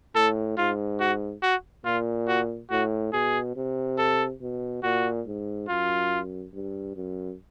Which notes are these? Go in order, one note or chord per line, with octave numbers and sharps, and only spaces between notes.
A2 A4
G#2 F4
F#4
F#4
A#2 F4
F#4
A2 F#4
B2 G#4
C3
A4
B2
A#2 F#4
G#2
F#2 F4
G2
F#2